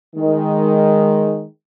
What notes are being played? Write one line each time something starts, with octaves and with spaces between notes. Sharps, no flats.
D#3 G#3